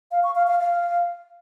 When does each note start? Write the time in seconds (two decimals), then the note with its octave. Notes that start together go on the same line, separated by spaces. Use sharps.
0.12 F5
0.23 C#6
0.35 F5
0.47 F5
0.59 F5